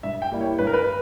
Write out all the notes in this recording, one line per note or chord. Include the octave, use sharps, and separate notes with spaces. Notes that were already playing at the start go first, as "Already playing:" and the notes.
G2 E5
G5
G3 A#3 E4
C#5
G2 B4
A#4
B4